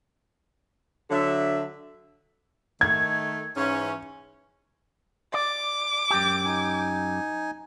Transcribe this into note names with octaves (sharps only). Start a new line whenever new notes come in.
D3 F#3 E5
D#3 A3 G#6
G#2 E3 C#4
D5 D6
F#2 G4
D#4 G#5